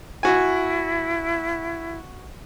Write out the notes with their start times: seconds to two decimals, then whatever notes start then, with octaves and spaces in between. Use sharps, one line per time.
0.23 E4 F#4 G#5